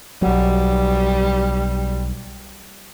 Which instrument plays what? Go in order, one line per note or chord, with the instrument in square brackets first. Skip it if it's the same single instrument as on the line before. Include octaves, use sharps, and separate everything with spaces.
[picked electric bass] B1 F#3 [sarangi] G3